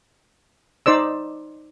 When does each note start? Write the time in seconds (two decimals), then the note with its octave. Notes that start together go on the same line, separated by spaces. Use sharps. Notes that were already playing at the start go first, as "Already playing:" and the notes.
0.86 D#4 C5 D5 E6